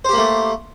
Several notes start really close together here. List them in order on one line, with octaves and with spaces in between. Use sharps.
C5 G4 A#3 A3